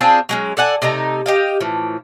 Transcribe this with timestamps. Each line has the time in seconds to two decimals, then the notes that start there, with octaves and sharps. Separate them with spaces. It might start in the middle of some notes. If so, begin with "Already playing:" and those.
0.01 C4 D4 F4 G#4
0.29 F#3 G#3 C#4
0.57 A4 D5 F#5 G#5
0.82 C3 A3 D#4 A#5
1.26 G4 D#5 F5
1.60 A2 E3 F3